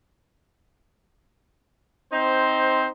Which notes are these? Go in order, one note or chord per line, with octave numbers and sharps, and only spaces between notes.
C4 D#4 C5